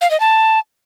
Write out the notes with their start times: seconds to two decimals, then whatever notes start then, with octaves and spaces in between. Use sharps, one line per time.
0.01 F5
0.11 D#5
0.20 A5